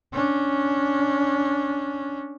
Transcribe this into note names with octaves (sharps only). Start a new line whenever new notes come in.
C#4 D4